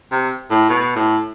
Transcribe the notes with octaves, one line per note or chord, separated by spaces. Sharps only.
C3
A2
B2
A2